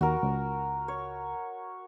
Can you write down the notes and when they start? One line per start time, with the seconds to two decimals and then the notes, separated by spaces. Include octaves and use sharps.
0.01 D#2 F#4 A#4
0.23 C#2
0.88 C#5